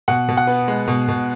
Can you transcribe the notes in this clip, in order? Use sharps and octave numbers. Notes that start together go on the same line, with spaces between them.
B2 F#5
B2
F#5
B3
G#3
B2
B2